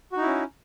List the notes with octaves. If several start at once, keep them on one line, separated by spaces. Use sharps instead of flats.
C#4 D#4 E4 F#4